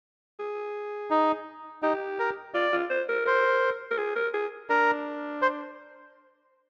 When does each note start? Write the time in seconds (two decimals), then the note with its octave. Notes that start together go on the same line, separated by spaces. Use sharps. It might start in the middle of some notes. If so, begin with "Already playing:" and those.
0.39 G#4
1.10 D#4
1.82 D#4 G4
2.19 A#4
2.54 F4 D5
2.73 F4
2.90 C5
3.09 A#4
3.26 A#4 C5
3.91 A#4
3.98 G#4
4.15 A#4
4.34 G#4
4.70 D4 A#4
5.42 C5